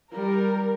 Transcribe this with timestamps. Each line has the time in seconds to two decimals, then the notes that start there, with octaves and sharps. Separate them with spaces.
0.13 G3 A#4